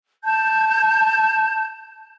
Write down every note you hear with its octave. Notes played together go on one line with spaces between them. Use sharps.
A5 G6